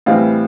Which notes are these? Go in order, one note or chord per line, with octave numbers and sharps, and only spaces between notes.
A2 E3 G3 C4 F5